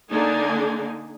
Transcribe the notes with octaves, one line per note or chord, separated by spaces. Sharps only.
D3 A#3 D4 D#4 G#5